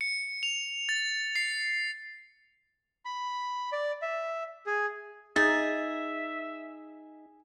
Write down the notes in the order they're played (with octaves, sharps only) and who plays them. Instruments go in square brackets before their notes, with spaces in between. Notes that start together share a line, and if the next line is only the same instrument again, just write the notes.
[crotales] C#7
F7
A6
C7
[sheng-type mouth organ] B5
D5
E5
G#4
[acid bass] D#4 [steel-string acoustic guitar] G#4 [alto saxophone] E5 [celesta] A6